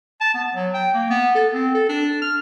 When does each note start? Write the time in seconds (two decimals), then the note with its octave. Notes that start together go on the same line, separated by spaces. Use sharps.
0.21 A5
0.34 B3
0.54 F#3
0.74 G5
0.94 A#3
1.10 B3
1.35 A4
1.53 C4
1.75 A4
1.89 D4
2.22 F6